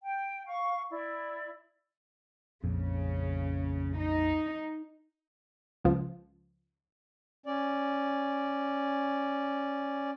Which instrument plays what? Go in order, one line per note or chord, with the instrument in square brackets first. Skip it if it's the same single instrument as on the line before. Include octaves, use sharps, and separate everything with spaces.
[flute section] G5
F5 C#6
E4 D5
[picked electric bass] A#1 F2 [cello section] C#3
[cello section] D#4
[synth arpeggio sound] C#2 F3
[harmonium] C#4 D5